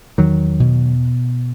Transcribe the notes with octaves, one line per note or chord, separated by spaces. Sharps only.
E2 D#3 F#3
B2